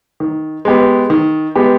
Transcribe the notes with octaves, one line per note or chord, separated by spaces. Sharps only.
D#3
G#3 B3 G4
D#3
G#3 B3 G4